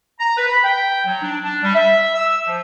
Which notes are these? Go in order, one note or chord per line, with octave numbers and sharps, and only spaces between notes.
A#5
B4
B5
G5
F#3
D4
D4
G3
E5
E6
F3